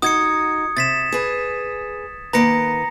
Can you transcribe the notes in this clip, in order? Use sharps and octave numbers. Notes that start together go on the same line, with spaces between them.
D#4 F#4 D#6 G#6 C#7
C3 A6 B6 E7
G#4 B4
D#3 A#3 B4 A#5 A#6 C#7